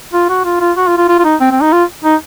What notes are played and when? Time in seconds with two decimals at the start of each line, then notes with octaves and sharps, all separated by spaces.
0.13 F4
0.30 F#4
0.45 F4
0.61 F4
0.77 F#4
0.88 F4
0.98 F4
1.09 F4
1.19 F4
1.25 D#4
1.41 C4
1.51 C4
1.62 D#4
1.73 F4
2.04 D#4